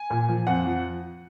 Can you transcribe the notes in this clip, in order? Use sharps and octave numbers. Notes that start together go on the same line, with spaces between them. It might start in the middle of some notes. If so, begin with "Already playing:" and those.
Already playing: G#5
A#2
F3
F2 F#5
F3